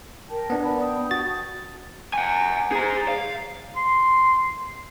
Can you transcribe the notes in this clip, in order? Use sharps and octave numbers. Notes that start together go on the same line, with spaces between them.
A#4 G5 A5
B3 D4
D5 A5 B5
G5 D#6
F#4 A6
F#5 G#5
G#4 A#5
F5
C6